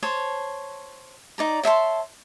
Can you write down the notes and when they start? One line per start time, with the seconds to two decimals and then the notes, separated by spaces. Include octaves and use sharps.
0.03 C5 C#5 A5
1.38 D#4 D5 A#5
1.63 C#5 E5 A5 C6